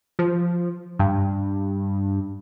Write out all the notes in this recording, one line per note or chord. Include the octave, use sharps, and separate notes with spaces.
F3
G2